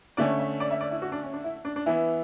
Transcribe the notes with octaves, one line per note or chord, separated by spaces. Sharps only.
D3 A3 C#4 D5
E5
D5
E5
D5
E4
F#4
D4
C#4
D4
E4
D4
D4
E3 B3 E4